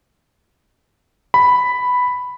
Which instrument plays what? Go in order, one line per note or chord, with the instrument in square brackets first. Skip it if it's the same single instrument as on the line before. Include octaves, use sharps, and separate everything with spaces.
[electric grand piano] B5